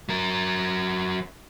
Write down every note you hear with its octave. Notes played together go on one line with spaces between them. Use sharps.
F#3 A#4